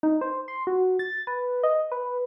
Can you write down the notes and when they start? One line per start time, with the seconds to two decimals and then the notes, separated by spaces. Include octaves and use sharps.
0.03 D#4
0.21 C5
0.48 C6
0.67 F#4
0.99 A6
1.27 B4
1.63 D#5
1.92 B4